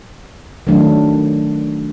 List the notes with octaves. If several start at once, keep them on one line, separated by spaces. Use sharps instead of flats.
D#3 F#3 A3 D4